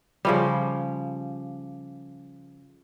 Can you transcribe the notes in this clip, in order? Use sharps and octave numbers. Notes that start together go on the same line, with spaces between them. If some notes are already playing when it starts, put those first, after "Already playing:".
C#3 F3 G3